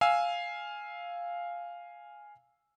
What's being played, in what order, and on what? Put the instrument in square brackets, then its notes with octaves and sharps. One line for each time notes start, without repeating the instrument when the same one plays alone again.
[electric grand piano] F5 G#5 E6